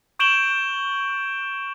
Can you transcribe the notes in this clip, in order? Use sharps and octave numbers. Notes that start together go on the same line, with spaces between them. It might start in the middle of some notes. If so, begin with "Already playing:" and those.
C#6 G6 D7 E7 F#7 G7